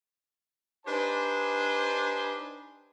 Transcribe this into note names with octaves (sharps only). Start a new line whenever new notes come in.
D4 D#4 G4 B4 C5 G#5